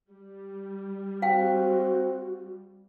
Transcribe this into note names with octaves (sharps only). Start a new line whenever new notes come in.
G3
C4 F#4 F5 G5